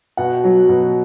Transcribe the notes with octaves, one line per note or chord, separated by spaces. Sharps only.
B2 F#5
F#3
B2